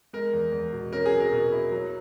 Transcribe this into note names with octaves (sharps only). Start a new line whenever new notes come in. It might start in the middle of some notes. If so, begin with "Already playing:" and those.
G#3 A#4
E2
E2
B2
C#4 A#4
G#4
F#3
A#4
B2
E4
F#3